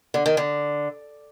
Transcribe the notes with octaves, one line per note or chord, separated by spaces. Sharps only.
D3
D#3
D3